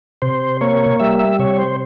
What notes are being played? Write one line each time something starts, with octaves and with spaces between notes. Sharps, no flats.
C3 C5
A#3 C#5
G3 E5
E5
C3 C#5
C5